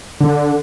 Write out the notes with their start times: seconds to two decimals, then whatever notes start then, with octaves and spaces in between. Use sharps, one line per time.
0.20 D3